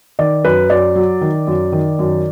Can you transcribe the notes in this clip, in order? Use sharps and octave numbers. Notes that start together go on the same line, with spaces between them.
D#3 D5
F#2 B4
F#2 D5
F#3
D#3
F#2
D#3
F#2